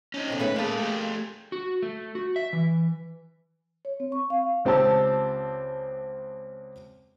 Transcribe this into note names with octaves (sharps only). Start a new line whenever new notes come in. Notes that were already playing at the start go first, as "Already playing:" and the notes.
C#4 D#4
F2 B2 D3
D#2 A3 C#4 B4
G#3 A#3 G#4 A4
A3 G4
F#4
A3
F#4
E5
E3
C#5
C4
C#6
F5
C#2 C4 G4 A5 E6